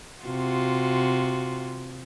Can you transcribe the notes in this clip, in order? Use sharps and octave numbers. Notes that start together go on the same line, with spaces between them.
C3 F4 F#4